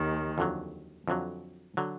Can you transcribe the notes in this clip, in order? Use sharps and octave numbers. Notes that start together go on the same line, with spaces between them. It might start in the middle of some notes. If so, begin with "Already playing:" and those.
Already playing: D#2 D#3
F2 D3 F#3
F2 D3 F#3
D3 F#3